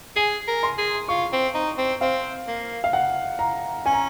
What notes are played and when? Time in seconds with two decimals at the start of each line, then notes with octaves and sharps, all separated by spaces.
0.16 G#4 G#5
0.48 A#4
0.63 C6
0.78 G#4
1.08 F4 C#6
1.32 C4
1.54 D#4
1.78 C4
2.01 C4 F5
2.47 A#3
2.84 F5
2.93 F#5
3.39 A#5
3.85 C#4 G#5
3.93 A#5